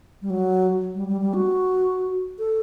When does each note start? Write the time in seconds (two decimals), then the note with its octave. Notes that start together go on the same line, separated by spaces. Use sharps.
0.22 G3
0.30 F#3
0.95 G3
1.08 G3
1.21 G3
1.34 F#4
2.39 A4